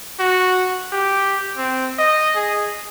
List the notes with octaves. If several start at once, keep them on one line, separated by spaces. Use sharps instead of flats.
F#4
G4
C4
D#5
G#4